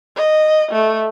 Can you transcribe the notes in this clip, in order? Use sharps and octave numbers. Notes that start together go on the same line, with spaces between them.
D#5
A3